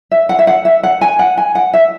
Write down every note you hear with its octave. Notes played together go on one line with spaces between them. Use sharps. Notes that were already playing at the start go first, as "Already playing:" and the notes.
E5
F#5
E5
F#5
E5
F#5
G#5
F#5
G#5
F#5
E5